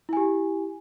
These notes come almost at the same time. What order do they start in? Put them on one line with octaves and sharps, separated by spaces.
E4 G#5 G4